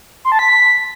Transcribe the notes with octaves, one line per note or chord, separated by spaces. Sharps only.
C6
A5
B6